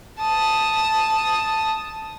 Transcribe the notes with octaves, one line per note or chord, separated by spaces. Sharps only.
A5 D#6